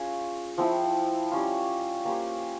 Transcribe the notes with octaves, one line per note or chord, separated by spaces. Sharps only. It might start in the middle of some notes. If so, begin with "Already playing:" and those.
Already playing: C#4 F4 G#4
F3 C4 E4
G3 C#4 F4
A#3 C#4 G4 C5